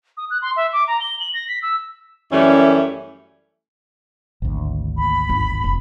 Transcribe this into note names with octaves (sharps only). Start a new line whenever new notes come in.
D#6
F#6
C6
E5
D6
A#5
G7
F#7
A#6
B6
E6
F#2 E3 G3 A3 C#4
G#1 D2
D#2 B5
G1
F1